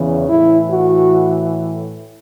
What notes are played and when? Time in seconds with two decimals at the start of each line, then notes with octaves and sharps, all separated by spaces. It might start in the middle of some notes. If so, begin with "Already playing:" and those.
Already playing: E2 C#3 E3
0.29 A2 E3 E4
0.71 F#4